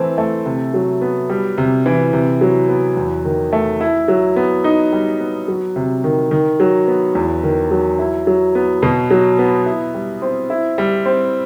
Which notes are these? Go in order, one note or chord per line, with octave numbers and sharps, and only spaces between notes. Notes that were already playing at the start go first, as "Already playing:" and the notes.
Already playing: E3 A3 C4
A3
C3
F#3
B3
G3
C3
E3
C3
F#3
B3
E2
D#3
A3
E4
F#3
B3
D#4
G3
B3
F#3
C3
D#3
D#3
F#3
B3
E2
D#3
F#3
E4
F#3
B3
B2
F#3
B3
E4
G3
C4
E4
G3
C4